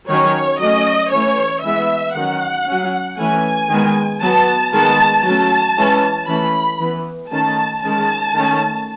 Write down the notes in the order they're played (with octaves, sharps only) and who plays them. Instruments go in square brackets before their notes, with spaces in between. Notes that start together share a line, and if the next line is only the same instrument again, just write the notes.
[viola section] D#3 F#3 C#4 C#5
F#3 A3 C#4 D#5
E3 A3 C#4 C#5
E3 G#3 B3 E5
D#3 F#3 C#4 F#5
F#3 C#4
E3 A3 C#4 G#5
D#3 G#3 B3
F#3 B3 A5
D#3 G#3 B3 A5
F#3 A3 C#4 A5
E3 G#3 C#4
E3 A3 C#4 B5
E3 B3
D#3 A3 C#4 A5
D#3 G#3 C#4 A5
D#3 A3 C#4